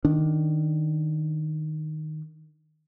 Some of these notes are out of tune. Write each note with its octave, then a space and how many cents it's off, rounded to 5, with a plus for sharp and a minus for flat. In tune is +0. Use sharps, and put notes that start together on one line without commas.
D#3 -5 D4 +0